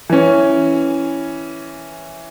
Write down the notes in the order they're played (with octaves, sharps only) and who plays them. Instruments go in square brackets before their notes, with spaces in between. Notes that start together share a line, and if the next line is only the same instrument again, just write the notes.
[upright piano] E3 C#4